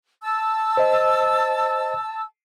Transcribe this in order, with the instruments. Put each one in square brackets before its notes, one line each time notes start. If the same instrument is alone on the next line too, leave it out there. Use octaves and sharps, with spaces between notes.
[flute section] A5 E6
[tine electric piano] C5 D#5